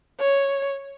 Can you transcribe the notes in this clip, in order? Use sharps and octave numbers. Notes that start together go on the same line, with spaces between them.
C#5